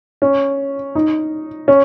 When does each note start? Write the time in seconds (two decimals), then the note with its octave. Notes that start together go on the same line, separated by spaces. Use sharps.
0.22 C#4
0.95 D#4
1.68 C#4